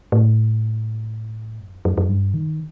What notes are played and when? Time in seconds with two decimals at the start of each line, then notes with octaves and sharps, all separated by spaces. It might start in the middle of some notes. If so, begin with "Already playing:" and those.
0.12 A2
1.60 F#2
1.85 F#2
1.98 F#2
2.09 G2
2.34 D#3